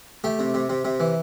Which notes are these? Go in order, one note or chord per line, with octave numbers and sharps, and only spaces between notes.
A3 G4
C3
C3
C3
C3
E3